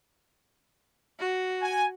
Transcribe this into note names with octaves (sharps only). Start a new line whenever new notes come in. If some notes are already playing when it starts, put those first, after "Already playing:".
F#4
G#5